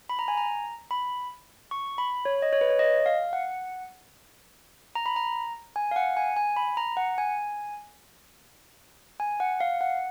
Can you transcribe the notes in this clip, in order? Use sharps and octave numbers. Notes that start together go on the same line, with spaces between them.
B5
A#5
G#5
A#5
B5
C#6
B5
C#5
D#5
C#5
B4
C#5
D#5
F5
F#5
A#5
B5
A#5
G#5
F5
F#5
G#5
G#5
B5
A#5
F#5
G#5
G#5
F#5
F5
F#5